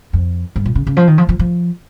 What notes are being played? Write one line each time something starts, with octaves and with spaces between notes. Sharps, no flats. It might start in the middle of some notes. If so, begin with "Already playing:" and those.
F2
G2
A#2
C#3
C#3
F3
D#3
F3
F3
F3